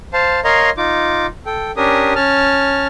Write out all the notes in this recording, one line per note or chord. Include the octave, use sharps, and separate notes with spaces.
C5 F5 A5
A#4 C#5 D#5 F5 A#5 C6
D#4 F4 D6
A4 G5
C#4 D4 G4 A#4 D#6
C#4 A5 F6